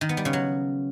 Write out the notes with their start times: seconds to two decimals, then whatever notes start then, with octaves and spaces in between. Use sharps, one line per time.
0.01 D#3
0.09 B3
0.17 G3
0.25 C#3
0.33 F#3